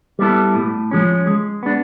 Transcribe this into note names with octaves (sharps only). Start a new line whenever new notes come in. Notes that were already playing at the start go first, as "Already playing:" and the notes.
G3 B3 E4 A4
A2
F3 G#3 C#4
G#3
B3 D4